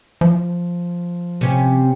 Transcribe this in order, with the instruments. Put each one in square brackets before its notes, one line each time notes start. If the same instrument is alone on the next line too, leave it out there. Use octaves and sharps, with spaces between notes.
[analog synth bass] F3
[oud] C3 C#4